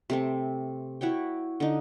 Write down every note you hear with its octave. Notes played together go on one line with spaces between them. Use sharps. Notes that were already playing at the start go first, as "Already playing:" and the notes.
C3 A3 C4
E4 F#4 C#5 G5
D3 D#4